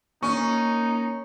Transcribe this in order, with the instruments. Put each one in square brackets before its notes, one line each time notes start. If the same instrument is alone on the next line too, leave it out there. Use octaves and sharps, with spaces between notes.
[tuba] A#3 [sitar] C#4 [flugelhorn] D#4 [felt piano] C#6